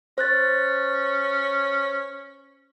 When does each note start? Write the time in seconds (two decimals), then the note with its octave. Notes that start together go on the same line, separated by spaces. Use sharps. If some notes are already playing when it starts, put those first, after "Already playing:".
0.18 C#4 C5 F#6 A6